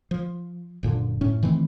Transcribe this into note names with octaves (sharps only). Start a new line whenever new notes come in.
F3
F#1 A#2 D3
F#1 A2 C#4
D#3 E3 A3 C4